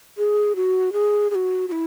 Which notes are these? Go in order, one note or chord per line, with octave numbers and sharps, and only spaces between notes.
G#4
F#4
G#4
G#4
F#4
F#4
E4